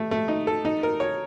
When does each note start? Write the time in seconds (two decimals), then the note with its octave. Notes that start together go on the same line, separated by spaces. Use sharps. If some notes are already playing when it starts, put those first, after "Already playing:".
Already playing: A3
0.11 A3
0.28 D#4
0.47 A4
0.65 D#4
0.83 A#4
1.00 C#5